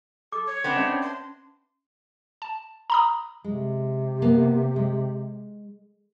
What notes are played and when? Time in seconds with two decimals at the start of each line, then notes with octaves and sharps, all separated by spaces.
0.32 A4 D6
0.46 C#5
0.64 B3 C4 D4
0.76 C#4 E5
1.02 C6
2.42 A5
2.90 A#5 B5 D#6
3.44 C3 G#3
4.22 A#3 B3
4.76 G#3